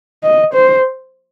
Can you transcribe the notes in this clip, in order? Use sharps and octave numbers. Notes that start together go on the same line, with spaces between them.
D#5
C5